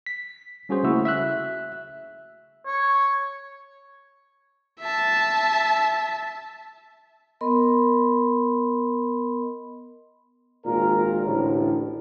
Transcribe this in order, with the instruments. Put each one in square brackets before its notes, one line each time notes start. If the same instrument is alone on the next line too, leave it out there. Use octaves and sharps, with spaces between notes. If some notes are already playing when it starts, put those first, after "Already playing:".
[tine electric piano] B6
G3 C#4 F#4 G#4 C5
C#3 A3 A#3 E4 F#4 E6
E5 E6 F#6
[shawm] C#5
[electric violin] E5 A5
[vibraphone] B3 A#4 D#5 B5 C6
[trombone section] G#1 A#2 A#4
A1 D2 A2